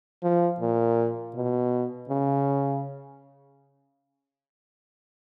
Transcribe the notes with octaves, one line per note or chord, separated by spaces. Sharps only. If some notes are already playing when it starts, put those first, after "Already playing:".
F3
A#2
B2
C#3